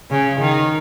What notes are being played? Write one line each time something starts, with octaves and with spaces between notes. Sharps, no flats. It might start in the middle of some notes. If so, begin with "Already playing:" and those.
C#3
D#3